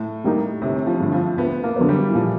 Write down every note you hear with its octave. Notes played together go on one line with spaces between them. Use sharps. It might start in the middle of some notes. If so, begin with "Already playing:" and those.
Already playing: A2
D#3 G3 A#3 D#4
G1 C3
F3
G2 D3
F3
D2 B3
A#3
D3 F#3 B3
G3
E3
A#2 F3